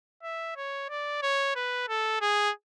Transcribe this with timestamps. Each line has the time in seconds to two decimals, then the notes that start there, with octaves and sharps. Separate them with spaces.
0.23 E5
0.56 C#5
0.89 D5
1.22 C#5
1.55 B4
1.88 A4
2.21 G#4